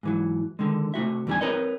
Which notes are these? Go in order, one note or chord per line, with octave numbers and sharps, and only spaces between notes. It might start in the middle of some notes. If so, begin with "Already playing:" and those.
G#2 E3 F#3
D3 D#3 G#3
C3 A3 F#4 E5
E2 B2 D#3 G3 D4 G#5
C4 A#4 B4 C#5 D#5